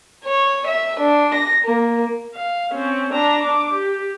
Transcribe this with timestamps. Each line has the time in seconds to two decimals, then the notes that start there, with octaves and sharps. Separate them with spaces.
0.23 C#5
0.66 E5
0.98 D4
1.34 A#6
1.64 A#3
2.35 F5
2.74 C4 C#4
3.12 D4 A#5
3.43 D4 D6
3.72 G4